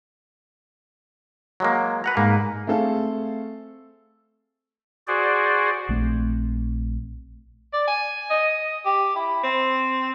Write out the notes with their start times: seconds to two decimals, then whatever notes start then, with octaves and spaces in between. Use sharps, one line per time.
1.60 F#3 G#3 A#3
2.04 B4 F#5 A#5
2.17 G#2 A#3
2.67 A3 C4 G#4 A4 F5
5.08 F#4 G#4 C5 D5
5.89 A#1 A3 C4
7.73 D5
7.87 G#5
8.30 D#5
8.85 G4
9.16 E4
9.43 C4